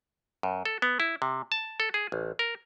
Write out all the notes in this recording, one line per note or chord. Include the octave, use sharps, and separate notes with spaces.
F#2
A4
B3
E4
C3
A5
A4
G#4
A1
A#4